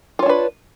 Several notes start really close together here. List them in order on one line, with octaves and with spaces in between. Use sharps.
F4 C#5 D4 B4